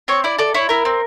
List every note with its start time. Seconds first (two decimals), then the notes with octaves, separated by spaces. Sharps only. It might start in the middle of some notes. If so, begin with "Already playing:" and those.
0.08 C4 C#5
0.24 E4 D5
0.39 A4 D5
0.54 E4 C#5
0.69 E4 A#4
0.85 C4